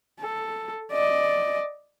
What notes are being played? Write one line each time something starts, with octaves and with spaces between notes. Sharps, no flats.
A4
D5 D#5